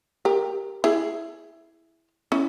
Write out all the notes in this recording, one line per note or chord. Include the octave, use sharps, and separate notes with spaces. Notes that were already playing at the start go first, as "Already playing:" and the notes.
G4 A#4
E4 G#4
C#4 E4